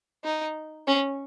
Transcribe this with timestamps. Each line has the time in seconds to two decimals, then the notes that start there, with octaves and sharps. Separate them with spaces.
0.24 D#4
0.87 C#4